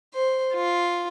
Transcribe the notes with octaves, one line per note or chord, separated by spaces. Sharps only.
C5
F4